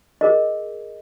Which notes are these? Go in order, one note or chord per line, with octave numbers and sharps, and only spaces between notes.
G#4 A#4 D#5